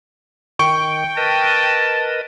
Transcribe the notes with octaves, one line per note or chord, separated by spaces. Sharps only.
D#3 G5 C#6
A#4 B4 D#5 A5